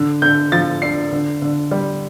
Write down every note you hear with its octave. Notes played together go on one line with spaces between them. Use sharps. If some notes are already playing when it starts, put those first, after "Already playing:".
Already playing: D3
D3 G6
F3 A6
D4 C7
D3
D3
G3